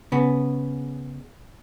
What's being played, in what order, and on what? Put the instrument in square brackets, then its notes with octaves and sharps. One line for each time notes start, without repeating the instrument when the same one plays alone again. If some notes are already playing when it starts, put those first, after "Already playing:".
[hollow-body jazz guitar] C#3 B3